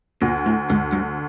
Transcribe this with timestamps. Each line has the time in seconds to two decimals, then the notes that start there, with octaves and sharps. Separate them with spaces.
0.21 D2 A#2
0.46 A2
0.70 D2 G#2
0.93 G2